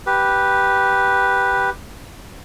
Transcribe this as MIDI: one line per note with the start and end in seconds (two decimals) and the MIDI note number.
0.06 1.70 67
0.06 1.70 71